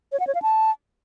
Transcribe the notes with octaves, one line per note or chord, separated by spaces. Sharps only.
C#5
F#5
C#5
F5
A5